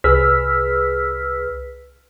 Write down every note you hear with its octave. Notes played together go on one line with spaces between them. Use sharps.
C2 G#4 B4 E6 F6 B6